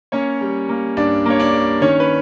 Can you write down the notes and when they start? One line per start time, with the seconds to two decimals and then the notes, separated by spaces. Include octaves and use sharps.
0.12 A#3 C#4 C#5
0.41 G3
0.69 A#3
0.97 G2 D4 D5
1.26 A#3 C#5
1.39 D4 D5
1.53 G3
1.81 D#3 C#4 C#5
2.00 B4